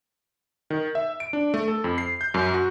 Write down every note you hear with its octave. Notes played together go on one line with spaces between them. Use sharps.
D#3
E5
D7
D4
A3
A4
F2
C7
G6
F#2
F#4